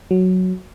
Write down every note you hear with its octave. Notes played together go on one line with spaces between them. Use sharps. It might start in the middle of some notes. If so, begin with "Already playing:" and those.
F#3